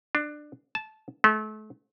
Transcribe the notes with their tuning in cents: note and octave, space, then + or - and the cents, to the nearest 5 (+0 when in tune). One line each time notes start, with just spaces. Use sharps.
D4 +20
A5 -15
A3 -35